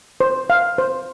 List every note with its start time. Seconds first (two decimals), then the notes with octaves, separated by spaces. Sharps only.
0.20 C5
0.50 F5
0.78 C5